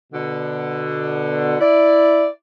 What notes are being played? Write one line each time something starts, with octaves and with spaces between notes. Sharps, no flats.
B2 D3
E4 D5